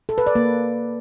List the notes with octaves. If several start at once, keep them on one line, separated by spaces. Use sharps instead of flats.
A4
B4
D5
A#3